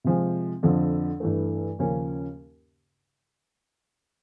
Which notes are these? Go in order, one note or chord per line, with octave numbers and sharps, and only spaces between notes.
C3 F3 G#3
F2 D3 F3
G2 E3 A3
D#2 C#3 F3 A#3 C#4